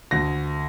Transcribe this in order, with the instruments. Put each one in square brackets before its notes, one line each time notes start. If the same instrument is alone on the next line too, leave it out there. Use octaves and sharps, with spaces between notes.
[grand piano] D2 A#6